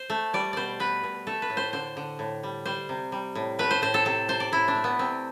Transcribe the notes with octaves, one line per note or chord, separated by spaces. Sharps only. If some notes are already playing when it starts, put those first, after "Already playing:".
Already playing: C5
A3
G3 D5
B2 C5 D5
B2 B4
B2
A3 A4
B4
A2
C5
D3 C5
D3
A2
G3
G3 C5
C3
G3
A2
A3 B4
C5
A2 C5
A4
C3 A4
C3 C5
D5
A2 E4
D4
A3
B3
C3 C4